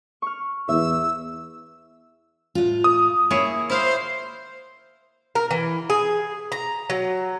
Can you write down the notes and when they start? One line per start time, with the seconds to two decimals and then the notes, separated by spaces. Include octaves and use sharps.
0.22 C#6 F6
0.69 E2 E5 E6
2.55 A2 F4
2.84 D#6
3.31 A#3 E4 G#4 C#5
3.70 E4 C5 F5
5.35 A#4
5.51 E3
5.90 G#4
6.52 A#5
6.90 F#3